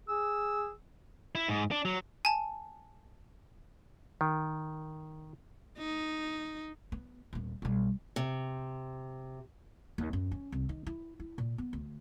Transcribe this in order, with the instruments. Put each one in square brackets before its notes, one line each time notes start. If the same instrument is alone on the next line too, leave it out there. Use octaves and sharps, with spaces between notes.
[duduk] G#4 [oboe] E6
[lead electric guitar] E4
G#2
D4
F#3
[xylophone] G#5 A5
[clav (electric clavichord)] D#3
[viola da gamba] D#4
[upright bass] B3
D#1 B3
B1 G3
[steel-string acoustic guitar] C3
[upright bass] D#2
F#2
C#4
C2
D#3
E4
E4
A#2
B3
D2